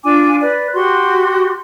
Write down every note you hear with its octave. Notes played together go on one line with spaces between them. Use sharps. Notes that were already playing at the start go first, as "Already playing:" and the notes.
D4 F4 G#5 D6
B4 D5
F#4 G4 C6